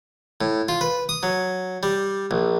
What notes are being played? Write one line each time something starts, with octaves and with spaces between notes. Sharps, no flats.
A2
F4
B4
D#6
F#3
G3
A#1